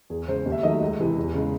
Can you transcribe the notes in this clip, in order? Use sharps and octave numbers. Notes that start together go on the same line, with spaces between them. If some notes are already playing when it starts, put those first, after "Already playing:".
E2 G#4
C#3 G#3 C5
D#2
E5
D#3 F#3 A3 D#5
C#2
C3 E3
E2
C#3 G#3